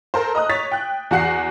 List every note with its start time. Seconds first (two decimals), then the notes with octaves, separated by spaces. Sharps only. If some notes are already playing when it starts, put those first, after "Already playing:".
0.14 A4 A#4 C5
0.35 D#5 A#5 D#6 F#6
0.49 C#5 A6 B6
0.71 G5 F#6
1.11 E2 F#4 F#5 F#6 C7